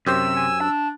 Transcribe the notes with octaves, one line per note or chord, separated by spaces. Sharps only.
F#2 C3 G4 C5 E6
G#5
D4 A5